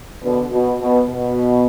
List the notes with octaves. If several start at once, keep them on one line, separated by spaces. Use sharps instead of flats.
B2 D3
B2
B2
B2